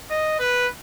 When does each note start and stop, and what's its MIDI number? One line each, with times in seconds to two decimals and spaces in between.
0.10 0.36 75
0.39 0.67 71